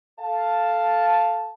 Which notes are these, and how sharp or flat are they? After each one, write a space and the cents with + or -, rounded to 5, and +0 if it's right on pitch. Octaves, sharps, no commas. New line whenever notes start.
A4 -10 F5 +0 A5 +0